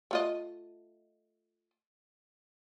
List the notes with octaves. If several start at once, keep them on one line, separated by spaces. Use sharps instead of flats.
A3 F4 D#5